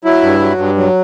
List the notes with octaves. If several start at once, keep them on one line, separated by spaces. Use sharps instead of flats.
F#3 E4
G2
F#3
G2
F#3